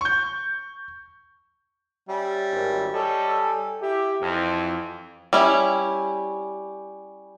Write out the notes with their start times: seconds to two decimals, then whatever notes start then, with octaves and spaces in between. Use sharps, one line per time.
0.01 C#6 G6
2.09 G3 C#4 E5
2.52 G#1
2.94 G3 A4 C#5 D#5
3.40 G#5
3.82 E4 G4 E5
4.22 F2 E3
5.33 G3 C#4 E4